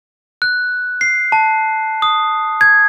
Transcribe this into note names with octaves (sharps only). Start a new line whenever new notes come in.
F#6
C7
A5
D#6
G#6